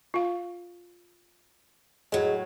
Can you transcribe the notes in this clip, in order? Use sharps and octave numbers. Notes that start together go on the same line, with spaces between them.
F4 F5
A2 F#3 G#4 D#5